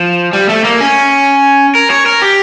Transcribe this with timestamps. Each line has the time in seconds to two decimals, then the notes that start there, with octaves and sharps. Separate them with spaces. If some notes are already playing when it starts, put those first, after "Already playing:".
Already playing: F3
0.33 G3
0.49 A3
0.64 A#3
0.80 C#4
1.75 A#4
1.90 C#5
2.06 A#4
2.22 G4